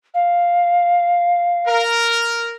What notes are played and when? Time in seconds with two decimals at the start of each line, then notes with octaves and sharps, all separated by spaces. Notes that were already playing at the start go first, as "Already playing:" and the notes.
0.14 F5
1.66 A#4